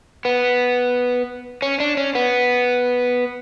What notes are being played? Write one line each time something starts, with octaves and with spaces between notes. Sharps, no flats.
B3
C#4
D4
C#4
B3